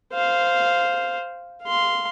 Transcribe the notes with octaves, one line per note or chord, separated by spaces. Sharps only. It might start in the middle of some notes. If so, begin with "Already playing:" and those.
C5 F5
F5 C6